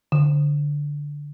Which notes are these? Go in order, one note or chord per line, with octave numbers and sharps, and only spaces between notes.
D3